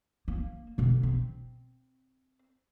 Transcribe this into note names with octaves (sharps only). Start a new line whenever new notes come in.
A#3
B2 D3
C4